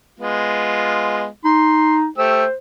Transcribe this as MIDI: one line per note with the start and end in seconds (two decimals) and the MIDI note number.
0.19 1.26 56
0.19 1.26 59
0.19 1.26 65
1.45 2.08 63
1.45 1.96 84
2.18 2.44 57
2.18 2.44 67
2.18 2.55 72
2.18 2.44 88